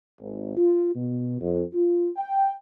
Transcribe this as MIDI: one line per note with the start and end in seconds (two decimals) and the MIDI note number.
0.20 0.55 32
0.57 0.92 65
0.94 1.38 47
1.40 1.62 41
1.74 2.10 65
2.17 2.50 79